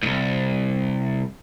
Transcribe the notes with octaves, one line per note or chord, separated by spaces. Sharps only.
C2 G#2